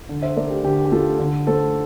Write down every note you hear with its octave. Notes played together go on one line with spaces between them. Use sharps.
D3
C5 E5
A3 A#4 D5
G4
D3 G4
G4
A3 F4 A4
D3
A3 A4 C5